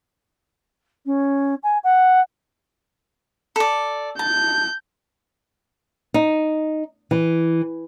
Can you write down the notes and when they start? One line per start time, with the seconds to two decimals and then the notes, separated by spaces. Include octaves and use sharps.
1.06 C#4
1.63 G#5
1.84 F#5
3.56 A4 D5
4.19 A5 G6
6.14 D#4
7.11 E3